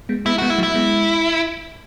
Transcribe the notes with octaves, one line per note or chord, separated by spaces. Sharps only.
G#3 B3
G#3 B3 E4
G#3 B3 F#4
E4
F#3 A3
E4
G#3 B3